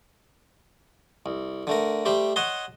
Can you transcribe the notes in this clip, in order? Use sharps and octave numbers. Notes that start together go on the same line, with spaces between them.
C2
D3 A3 A#4
G3 A3 G4 C5
C#5 D#5 F#5 A5 C6